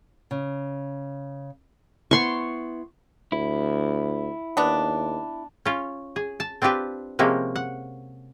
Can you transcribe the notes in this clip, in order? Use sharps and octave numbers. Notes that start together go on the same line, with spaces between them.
C#3
B3 E4 C6 C#6
D2 E4
D#2 B3 D4
C#4 F4
G#4
A5
C4 D4 F4 G4 B4
C3 F3 G#3 A#3 C#4
F#5